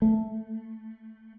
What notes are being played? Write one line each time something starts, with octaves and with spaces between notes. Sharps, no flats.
A3